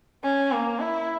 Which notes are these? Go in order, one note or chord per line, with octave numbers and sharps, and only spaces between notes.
C#4
A#3
E4